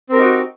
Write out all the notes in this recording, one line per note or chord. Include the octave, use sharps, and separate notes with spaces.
C4 D#4 F#4 G4 A#4